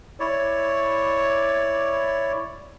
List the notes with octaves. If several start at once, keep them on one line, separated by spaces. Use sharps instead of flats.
E4 C#5 D5